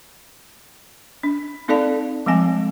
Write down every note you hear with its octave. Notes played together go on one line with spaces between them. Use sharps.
D4
C4 D#4 A4 D5 F5 A5
F3 G3 G#3 C4 G#5